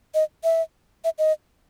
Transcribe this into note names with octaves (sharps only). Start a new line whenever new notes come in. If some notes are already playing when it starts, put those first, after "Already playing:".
D#5
E5
E5
D#5